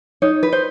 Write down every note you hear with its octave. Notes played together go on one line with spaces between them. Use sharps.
D#4 C#5
B4
C5